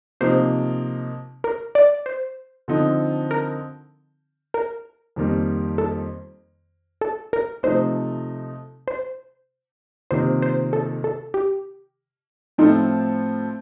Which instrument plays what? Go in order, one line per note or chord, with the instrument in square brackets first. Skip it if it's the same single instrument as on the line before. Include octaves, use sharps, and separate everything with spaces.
[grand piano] C3 F3 A#3 D#4 [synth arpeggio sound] C5
[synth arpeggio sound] A#4
D5
C5
[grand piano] D3 F3 C4 D#4 A4
[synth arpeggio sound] A#4
A#4
[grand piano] F2 D#3 G3 A#3
[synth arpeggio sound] A4
A4
A#4
[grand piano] C3 F3 A3 D#4 [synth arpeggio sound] C5
[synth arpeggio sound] C5
[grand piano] C3 D#3 A#3 F4 [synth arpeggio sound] C5
[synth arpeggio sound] C5
A4
A4
G4
[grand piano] A2 F3 C4 F4 A4 [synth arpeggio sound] D#4